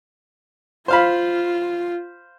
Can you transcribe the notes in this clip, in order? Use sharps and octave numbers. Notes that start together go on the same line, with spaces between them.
F4 C5 F5 B5